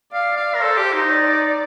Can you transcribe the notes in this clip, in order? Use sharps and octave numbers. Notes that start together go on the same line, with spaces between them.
D5 F5
F5
A#4
A4 C5
G4
D#4
D5